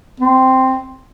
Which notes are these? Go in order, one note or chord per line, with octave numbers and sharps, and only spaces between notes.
C4